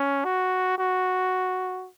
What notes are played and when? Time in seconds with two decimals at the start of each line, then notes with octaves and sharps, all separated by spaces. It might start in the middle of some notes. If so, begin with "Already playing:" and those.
Already playing: C#4
0.25 F#4
0.78 F#4